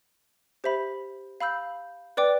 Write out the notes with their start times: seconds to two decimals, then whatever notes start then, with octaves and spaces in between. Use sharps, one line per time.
0.64 G4 C5 E5 B5
1.41 F5 B5 E6 G6
2.17 B4 D5 G5 D6